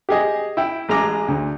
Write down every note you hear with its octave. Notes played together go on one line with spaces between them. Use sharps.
G4 G#4 D#5
E4 G5
A1 G#3 A#5 D6
D2